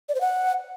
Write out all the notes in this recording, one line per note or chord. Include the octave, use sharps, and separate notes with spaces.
D5
C5
F#5